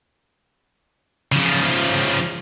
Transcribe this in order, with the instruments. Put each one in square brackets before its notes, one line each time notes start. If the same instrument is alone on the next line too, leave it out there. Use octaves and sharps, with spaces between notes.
[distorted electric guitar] C#3 F3